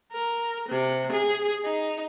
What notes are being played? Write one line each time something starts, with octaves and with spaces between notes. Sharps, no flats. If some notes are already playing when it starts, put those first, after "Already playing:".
A#4
C3
G#4
D#4